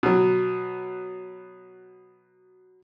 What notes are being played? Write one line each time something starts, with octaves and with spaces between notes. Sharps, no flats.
B2 F#3